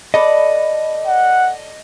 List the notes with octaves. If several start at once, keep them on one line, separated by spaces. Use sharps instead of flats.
A4 B4 D5 D#5
F#5